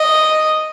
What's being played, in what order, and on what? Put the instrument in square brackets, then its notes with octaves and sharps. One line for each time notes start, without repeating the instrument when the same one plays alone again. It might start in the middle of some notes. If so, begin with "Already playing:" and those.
Already playing: [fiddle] D#5